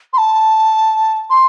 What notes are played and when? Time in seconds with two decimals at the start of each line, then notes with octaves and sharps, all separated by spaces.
0.13 C6
0.17 A5
1.30 C6